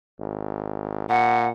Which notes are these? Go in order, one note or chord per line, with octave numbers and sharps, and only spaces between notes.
G#1
A#2 F#5